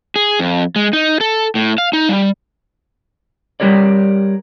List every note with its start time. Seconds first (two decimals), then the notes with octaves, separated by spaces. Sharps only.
0.16 G#4
0.39 F2
0.76 G#3
0.93 D#4
1.21 A4
1.55 A2
1.78 F5
1.93 D#4
2.09 G3
3.60 G3 G4 A#4 C#5 D5